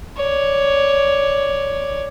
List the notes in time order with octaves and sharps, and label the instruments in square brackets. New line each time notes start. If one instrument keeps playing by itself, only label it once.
[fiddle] C#5 D5